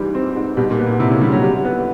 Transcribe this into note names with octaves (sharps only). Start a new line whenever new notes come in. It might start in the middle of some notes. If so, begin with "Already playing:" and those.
Already playing: G#2 E3 G3
C4
G#2
B2 G3
A#2
B3
A#2
C3 E4
C#3
D3 G3
F#3
G3
B3